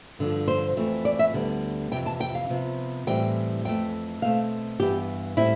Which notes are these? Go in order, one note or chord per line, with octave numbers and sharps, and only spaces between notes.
G2 D3 F3
C5
F2 E3 A3 C4
D5
E5
D2 D3 G3 B3
F2 C3 E3 G5
A5
G5
F5
C3 F3 B3
A2 E3 G3 C4 G5
F2 E3 A3 G5
B2 A3 C4 F5
G2 E3 B3 G4
A2 G3 C4 E4